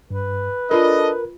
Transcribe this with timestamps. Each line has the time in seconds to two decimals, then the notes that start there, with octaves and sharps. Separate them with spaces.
0.10 G2 B4
0.71 D4 F4 A4 A#4 D#5 B5